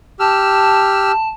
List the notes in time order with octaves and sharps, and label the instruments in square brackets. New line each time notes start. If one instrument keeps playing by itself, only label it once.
[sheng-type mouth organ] G4 E6 F6 [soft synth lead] A5